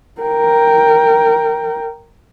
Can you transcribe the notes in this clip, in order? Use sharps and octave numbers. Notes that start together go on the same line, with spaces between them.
A#4 G5